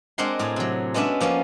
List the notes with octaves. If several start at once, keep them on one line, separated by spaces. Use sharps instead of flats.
G#3 C4 D4 A#4 F#5 C6
A2 G#4 A#5
C3 F#3
G#3 B3 C#4 D4 E5
F3 A#3 B3 C#4